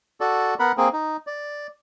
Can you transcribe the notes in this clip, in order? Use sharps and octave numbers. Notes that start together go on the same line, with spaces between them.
F#4 A4 D5
B3 A#4 F#5 B5
A#3 C4 G#4
D#4
D5